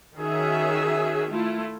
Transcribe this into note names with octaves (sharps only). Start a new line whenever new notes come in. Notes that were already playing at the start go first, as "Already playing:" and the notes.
D#3 C#4 F#4 G#4 E5
A3 E4 F4